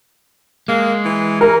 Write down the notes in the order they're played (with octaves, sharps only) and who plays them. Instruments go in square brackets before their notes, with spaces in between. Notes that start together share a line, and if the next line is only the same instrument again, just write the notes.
[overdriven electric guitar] G#3 [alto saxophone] A#3
[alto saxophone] E3
[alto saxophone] E3 [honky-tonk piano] A#4